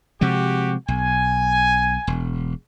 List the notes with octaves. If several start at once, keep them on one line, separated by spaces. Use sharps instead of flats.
C3 F3 G#3 F#4 G4
B1 G#5
E1